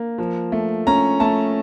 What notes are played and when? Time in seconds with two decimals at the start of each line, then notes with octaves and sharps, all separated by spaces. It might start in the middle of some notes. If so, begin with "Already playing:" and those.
Already playing: A#3
0.18 F3
0.52 A3
0.87 C#4 A#5
1.20 A3 A5